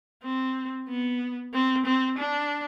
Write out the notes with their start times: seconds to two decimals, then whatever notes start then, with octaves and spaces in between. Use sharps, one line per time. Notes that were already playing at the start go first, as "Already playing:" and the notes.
0.23 C4
0.89 B3
1.53 C4
1.86 C4
2.19 D4